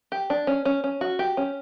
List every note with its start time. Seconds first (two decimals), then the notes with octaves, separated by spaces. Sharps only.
0.12 G4
0.30 D4
0.47 C#4
0.65 C#4
0.84 C#4
1.01 F#4
1.19 G4
1.37 C#4